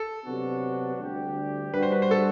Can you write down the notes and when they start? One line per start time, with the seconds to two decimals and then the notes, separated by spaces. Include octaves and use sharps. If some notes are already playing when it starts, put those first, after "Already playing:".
Already playing: A4
0.24 C3 F#3 B3 D4 F#4
0.99 D2 D3 G3 D4 G4
1.74 G3 D4 F#4 B4
1.83 C5
1.92 B4
2.02 C5
2.11 A4